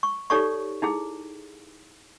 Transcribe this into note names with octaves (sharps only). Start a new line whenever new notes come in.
C#6
D#4 G4 A4 C#5 D5 C#6
D#4 E4 G#4